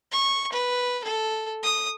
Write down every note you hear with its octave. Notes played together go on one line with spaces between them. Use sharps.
C#6
B4
A4
D#6